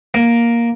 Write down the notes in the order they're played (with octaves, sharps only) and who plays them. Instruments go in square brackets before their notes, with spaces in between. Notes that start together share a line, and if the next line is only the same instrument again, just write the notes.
[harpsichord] A#3